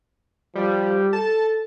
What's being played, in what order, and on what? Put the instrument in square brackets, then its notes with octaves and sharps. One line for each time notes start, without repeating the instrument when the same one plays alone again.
[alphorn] F3 [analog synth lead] G3
[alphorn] A4 [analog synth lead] A5